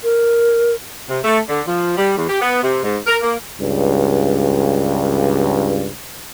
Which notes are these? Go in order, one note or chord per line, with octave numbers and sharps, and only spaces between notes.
A#4
C3
A3
D3
F3
G3
E2
G4
B3
C3
G#2
A#4
A#3
C#2 G2